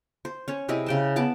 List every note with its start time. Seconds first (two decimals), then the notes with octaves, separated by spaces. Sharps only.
0.25 C5
0.48 C#4 C#5
0.69 C3 E4 G#4 D#5
0.86 C#3 G5 A5
1.16 B3 A5 D6